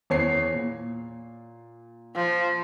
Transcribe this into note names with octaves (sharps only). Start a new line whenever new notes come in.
E2 C#5 C7
A#2
F3